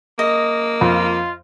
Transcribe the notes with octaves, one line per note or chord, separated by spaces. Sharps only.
A#3 D#5
F2 F4